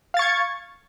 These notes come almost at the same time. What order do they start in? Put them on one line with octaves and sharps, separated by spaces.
F5 A6 C#6 G#6